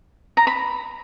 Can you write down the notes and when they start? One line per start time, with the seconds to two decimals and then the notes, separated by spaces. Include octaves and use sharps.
0.37 A#5
0.47 B5